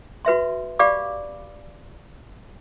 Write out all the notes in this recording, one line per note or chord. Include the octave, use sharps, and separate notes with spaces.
F#4 B4 E5 C6
G4 D5 F5 B5 D6